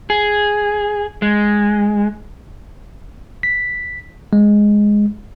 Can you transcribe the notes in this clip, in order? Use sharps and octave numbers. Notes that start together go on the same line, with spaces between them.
G#4
G#3
B6
G#3